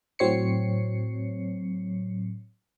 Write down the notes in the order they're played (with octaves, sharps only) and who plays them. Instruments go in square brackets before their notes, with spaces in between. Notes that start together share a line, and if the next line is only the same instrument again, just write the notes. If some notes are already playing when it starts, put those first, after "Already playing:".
[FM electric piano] A2 F#3 C4 C#5 C7 C#7